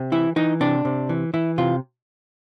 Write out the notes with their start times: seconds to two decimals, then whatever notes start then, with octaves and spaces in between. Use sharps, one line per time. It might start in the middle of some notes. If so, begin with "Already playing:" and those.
Already playing: C3
0.12 E3 E4
0.36 E3 D#4
0.60 C3 D4
0.85 C3
1.09 E3
1.34 E3 E4
1.58 C3 F4